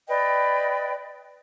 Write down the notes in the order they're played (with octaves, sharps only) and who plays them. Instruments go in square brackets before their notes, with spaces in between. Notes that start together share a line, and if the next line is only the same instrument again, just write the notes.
[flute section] B4 D5 D#5 G5